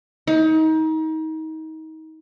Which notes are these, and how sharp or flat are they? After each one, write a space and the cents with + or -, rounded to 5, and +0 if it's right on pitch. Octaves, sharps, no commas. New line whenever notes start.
D#4 +30